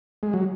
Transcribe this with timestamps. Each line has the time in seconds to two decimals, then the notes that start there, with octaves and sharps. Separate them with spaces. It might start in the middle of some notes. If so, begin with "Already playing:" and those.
0.23 G#3
0.33 F#3